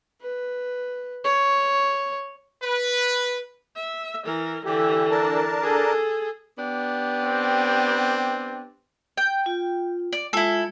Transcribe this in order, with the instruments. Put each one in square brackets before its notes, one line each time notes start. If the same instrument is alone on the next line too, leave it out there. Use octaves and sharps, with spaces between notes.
[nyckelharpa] B4
C#5
[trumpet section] B4
[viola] E5
E3 A#4
[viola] D3 E3 [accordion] G4
[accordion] D4 A#4 A5
[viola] G#4 A4
[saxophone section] B3 D4 G4
[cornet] C4
[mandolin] G5
[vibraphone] F4
[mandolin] D5
[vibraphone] G#3 F4 [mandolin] E4 A4